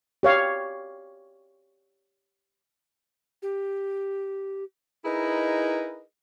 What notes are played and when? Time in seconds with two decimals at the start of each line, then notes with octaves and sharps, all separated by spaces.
0.23 G4 C#5 F5
3.42 G4
5.05 D#4 E4 G#4 A#4 B4 D#5